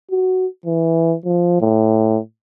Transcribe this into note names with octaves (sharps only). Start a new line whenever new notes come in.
F#4
E3
F3
A2